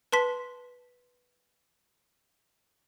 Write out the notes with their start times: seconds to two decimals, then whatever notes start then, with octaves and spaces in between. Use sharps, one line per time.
0.12 B4 A5 C6 B6